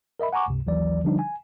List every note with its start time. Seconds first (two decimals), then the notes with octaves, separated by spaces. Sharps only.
0.19 A#4 D#5 E5 B5
0.33 F#5 G#5 A#5 C#6 D6
0.48 C#2 G2 C3
0.66 A1 D#2 E3 F#3 D5
1.04 D3 F3 G3 D4 D#4
1.19 G#5